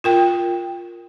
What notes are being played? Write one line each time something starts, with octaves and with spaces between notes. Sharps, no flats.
F4 A#4 G5